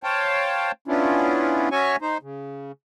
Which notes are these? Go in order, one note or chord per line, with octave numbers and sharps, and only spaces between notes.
C5 C#5 F5 G5 A5
B3 C#4 D4 E4 F4
C#4 F#4 C#5 E5 G#5 C#6
D#4 C5
C#3